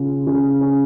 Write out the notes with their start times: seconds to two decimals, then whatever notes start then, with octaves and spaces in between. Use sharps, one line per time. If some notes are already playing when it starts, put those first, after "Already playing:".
Already playing: C#3 F4
0.27 C#3
0.61 C#4